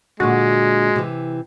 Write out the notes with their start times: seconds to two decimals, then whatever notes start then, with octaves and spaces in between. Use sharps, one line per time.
0.20 A#2 D3 G#3 F#4
0.96 C3 E3